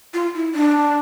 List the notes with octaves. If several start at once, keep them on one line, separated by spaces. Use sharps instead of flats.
F4
E4
D4